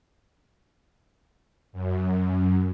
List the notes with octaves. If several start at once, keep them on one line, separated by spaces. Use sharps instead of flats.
F#2